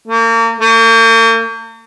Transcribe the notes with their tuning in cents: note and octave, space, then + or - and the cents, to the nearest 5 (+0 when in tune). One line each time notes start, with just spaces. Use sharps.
A#3 -35
A#3 -45